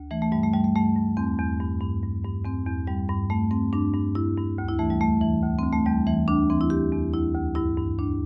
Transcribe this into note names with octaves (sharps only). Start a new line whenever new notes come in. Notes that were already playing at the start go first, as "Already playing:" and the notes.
Already playing: D2
E3 A3
A3
G2 G3
A3
G2 G3
A3
G2 A3
G2
E2 C4
E2
G2
G2
G2
G2
E2 C4
E2
G2 G3
G2
G2 A3
G2 C4
G2 D4
G2
G2 E4
G2
D2
E4
E3 A3
G3
E2 A3
E3
D2
C4
D2
A3
E2 G3
E3 A3
D2 D4
E3 C4
E4
E2 G4
E2
D2 E4
D2
G2 E4
G2
D2 D4